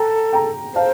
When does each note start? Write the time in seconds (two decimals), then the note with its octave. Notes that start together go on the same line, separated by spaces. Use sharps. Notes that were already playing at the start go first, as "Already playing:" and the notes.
Already playing: A4 G5 A#5
0.33 G5 A#5
0.75 C5 F5 A5